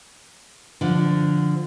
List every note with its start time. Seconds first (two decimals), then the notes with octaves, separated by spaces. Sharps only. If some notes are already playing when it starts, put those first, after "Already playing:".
0.81 D3 F3